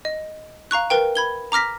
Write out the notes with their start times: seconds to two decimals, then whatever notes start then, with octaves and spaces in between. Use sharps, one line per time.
0.05 D#5
0.71 F5 A#5 C#6 F#6
0.90 A#4 B4 G5
1.15 B5 G#6 G7
1.52 A#5 D6 F6 A#6 B6